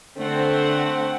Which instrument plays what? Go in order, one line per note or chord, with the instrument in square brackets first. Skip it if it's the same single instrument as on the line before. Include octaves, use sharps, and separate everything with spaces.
[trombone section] D3 [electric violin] A3 F#5 [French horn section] C4